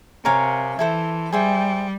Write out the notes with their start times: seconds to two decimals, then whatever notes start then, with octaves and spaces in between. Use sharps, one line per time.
0.24 C3 A#4 C#5 F5 G#5
0.78 E3 E4 A4 C5
1.32 G3 G#4 C5 E5 G5